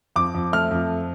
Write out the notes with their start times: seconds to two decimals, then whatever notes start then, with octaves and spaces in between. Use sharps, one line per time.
0.16 F2 D6
0.35 F2
0.52 A3 F6
0.71 F2